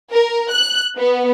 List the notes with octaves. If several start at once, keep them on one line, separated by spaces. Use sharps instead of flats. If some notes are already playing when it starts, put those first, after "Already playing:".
A#4
F#6
B3